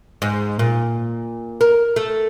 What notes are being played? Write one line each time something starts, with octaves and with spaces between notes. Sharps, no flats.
G#2
A#2
A#4
A3